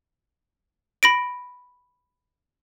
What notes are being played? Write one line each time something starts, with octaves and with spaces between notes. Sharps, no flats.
B5 A#6 D7